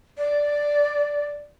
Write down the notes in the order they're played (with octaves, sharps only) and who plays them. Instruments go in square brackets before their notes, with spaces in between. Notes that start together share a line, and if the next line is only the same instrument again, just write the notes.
[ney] D5